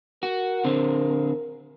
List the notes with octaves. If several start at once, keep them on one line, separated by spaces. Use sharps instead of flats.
F#4 A#4
D3 C4